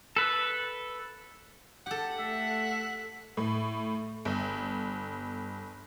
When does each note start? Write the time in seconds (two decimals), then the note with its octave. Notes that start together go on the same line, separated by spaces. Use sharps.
0.16 A4 B4
1.86 G4 A4 F#5
2.20 A3 E5
3.37 A2
4.25 G1